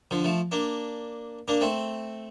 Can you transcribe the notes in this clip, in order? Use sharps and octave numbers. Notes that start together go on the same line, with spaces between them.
D3 F3
F3 A3
A#3 D4
A#3 D4
A3 C4